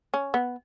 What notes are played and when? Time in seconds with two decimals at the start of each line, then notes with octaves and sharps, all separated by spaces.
0.14 C#4
0.34 B3